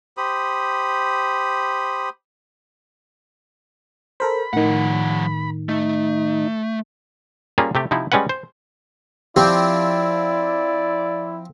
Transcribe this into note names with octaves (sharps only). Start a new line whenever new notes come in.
G4 C5 B5 D#6
A4 A#4 C5 B5
A2 D#3 F3 F#5
A3 D#4
G3 A#3 C#4 F4 G#4
C3 A3 G4
C3 F3 D#4 E4
G3 G#3 C#4 B4 F#5
C5
F3 C4 E4 G4 D5